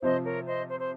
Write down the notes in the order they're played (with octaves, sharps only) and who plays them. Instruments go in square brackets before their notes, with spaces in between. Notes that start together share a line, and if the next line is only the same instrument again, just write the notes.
[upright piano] C3 F3 C4 [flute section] C5 D#5
[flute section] A#4 C#5
C5 D#5
C5
C5